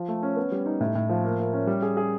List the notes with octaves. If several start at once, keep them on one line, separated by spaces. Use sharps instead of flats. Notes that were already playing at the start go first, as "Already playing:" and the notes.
Already playing: F3
A3
C#4
B3
G3
D#4
A2
A2
F3
A#3
A#3
C#4
G3
G#4
G#4